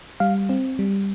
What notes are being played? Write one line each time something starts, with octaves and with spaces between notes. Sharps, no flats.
G3 F5
C4
G3